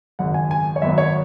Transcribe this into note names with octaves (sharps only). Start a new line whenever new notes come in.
G#1 F#2 C#3 F#5
G#5
G#5
C#5
G#1 F#2 F#3 B3 E5
C#5